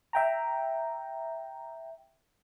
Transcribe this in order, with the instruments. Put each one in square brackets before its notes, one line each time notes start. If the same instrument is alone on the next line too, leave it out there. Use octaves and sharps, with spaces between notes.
[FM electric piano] E5 G5 A#5